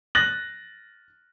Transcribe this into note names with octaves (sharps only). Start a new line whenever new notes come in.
F#6 A6 A#6 F#7